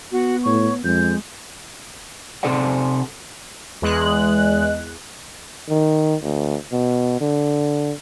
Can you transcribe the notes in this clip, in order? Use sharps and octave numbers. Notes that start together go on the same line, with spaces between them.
B3 F#4
A2 C#5 C#6
F2 G#3 G6
C3 A4 C5 D5 F#5
E2 G#3 F#6
D#3
D2
B2
D3